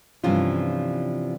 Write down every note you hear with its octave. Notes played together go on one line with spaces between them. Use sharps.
G2 C3 E3 F3 C#4 F4